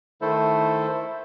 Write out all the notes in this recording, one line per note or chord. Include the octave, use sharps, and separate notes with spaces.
D#3 A3 E4 A4 C5